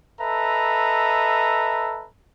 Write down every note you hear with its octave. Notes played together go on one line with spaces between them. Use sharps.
A4 B4 D#5 E5 A#5